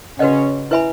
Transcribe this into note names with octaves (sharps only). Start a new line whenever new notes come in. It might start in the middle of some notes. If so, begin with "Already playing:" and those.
C#3 C#4 F#4 B4 D#5 F#5
E4 B4 E5 G#5 B5